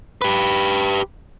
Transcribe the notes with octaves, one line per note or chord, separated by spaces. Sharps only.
G4 B4